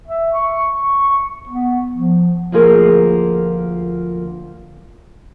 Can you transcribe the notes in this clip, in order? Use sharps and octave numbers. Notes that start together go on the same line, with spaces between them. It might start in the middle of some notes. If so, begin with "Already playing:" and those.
E5
C#6
B3
F3
D2 F3 A#3 F4 G#4 A#4